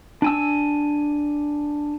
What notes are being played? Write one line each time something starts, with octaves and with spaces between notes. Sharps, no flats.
D4 G#5 E6